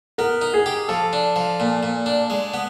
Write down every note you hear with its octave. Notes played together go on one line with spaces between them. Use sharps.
B3 A#4
D#4
G#4
G4
F3 A4
D4
F3
A#2
A#2
D4
G#3
B3